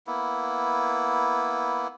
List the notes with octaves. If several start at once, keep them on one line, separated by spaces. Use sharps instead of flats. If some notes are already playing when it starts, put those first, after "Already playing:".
A#3 B3 E4